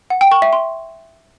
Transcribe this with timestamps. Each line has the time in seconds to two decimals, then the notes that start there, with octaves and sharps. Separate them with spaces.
0.10 F#5
0.21 G5
0.32 C#6
0.42 E5
0.53 C6